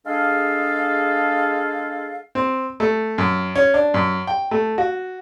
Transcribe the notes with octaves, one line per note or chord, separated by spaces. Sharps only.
G#3 D4 G#4 A4 F5
C4
A3
F#2
C#4
D4
F#2
G5
A3
F#4